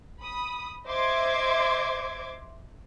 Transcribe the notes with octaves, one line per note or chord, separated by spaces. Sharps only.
B5 D#6
C5 D#5 E5 C6 D6 G#6